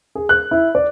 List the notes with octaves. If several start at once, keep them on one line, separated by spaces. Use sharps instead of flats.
G#4
F#6
E4
D5